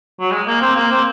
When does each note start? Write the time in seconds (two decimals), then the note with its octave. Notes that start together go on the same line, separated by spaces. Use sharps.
0.20 F#3
0.31 G#3
0.47 A#3
0.61 C4
0.76 A#3
0.91 C4